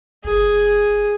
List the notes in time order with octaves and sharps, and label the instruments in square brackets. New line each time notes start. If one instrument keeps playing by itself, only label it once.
[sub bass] F#1 [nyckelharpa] G#4